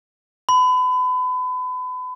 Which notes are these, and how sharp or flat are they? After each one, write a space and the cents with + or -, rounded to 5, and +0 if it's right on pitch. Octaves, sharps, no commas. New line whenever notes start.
B5 +35